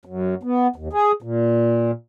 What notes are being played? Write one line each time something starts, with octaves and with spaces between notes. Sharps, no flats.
F#2
B3
D#2
G#4
A#2